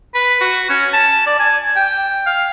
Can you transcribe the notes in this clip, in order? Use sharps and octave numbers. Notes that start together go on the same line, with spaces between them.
B4
F#4
C#4
A5
D5
G#5
G5
F5